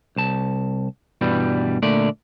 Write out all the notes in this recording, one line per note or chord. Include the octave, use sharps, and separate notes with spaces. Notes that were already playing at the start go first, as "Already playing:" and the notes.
C2 A5
G2 B2 E3 G3
A#2 D3 A3 D5